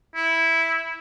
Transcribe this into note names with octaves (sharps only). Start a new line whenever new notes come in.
E4